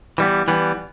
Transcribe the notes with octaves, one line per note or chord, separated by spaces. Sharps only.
E3 G3 B3
E3 G3 B3